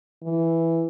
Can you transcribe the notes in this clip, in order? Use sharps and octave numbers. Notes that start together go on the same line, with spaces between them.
E3